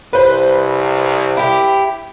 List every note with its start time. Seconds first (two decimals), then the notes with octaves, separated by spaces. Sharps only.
0.13 C2 B4 C5
1.37 E4 G4